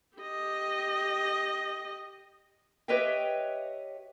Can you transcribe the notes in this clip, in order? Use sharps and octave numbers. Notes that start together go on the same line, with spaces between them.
G4 D#5
G4 B4 C#5 D#5 E5 G5